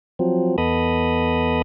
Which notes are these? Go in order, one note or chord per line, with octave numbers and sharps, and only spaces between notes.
F3 F#3 C4
E2 B3 A4 D#5 B5 D#6